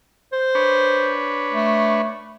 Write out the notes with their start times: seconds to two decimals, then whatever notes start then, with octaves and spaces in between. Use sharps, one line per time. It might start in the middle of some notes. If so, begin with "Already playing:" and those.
0.32 C5
0.55 D4 B4 C#5
1.52 A3